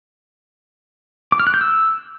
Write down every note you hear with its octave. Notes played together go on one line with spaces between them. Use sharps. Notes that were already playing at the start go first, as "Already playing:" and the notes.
D6
F6
F#6
G6
E6